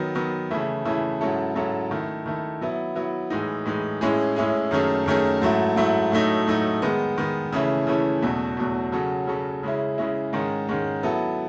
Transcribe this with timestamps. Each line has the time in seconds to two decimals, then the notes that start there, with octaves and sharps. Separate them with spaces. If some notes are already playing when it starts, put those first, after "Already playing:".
Already playing: D#3 F#3 B3
0.15 D#3 F#3 B3
0.51 C#3 E3 A3 E4
0.85 C#3 E3 A3 E4
1.21 G#2 F#3 C#4 E4 A4
1.55 G#2 F#3 C#4 E4 A4
1.91 D#3 A3 E4
2.26 D#3 A3 E4
2.61 F#3 B3 E4
2.95 F#3 B3 E4
3.30 A2 E3 G#3 D#4
3.66 A2 E3 G#3 D#4
4.01 A2 G#3 C#4 E4 G#4
4.36 A2 G#3 C#4 E4 G#4
4.71 F#2 D#3 A3 C#4 G#4
5.06 F#2 D#3 A3 C#4 G#4
5.42 G#2 F#3 A3 E4
5.76 G#2 F#3 A3 E4
6.12 A2 F#3 A3 D#4
6.47 A2 F#3 A3 D#4
6.82 D#3 G#3 B3
7.17 D#3 G#3 B3
7.52 C#3 E3 A3 C#4 E4
7.87 C#3 E3 A3 C#4 E4
8.22 E2 B2 F#3 A3
8.57 E2 B2 F#3 A3
8.92 C#3 F#3 C#4 F#4 A4
9.27 C#3 F#3 C#4 F#4 A4
9.63 C#3 G#3 C#4 E4
9.98 C#3 G#3 C#4 E4
10.33 G#2 D#3 G#3 C#4
10.69 G#2 D#3 G#3 C#4
11.03 F#3 B3 E4 A4